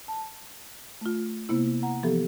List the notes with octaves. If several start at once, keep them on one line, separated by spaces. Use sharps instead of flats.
A5
A3 F4
C3 A#3 B3 E4
F#5 A#5
E3 F3 B3 G4 A4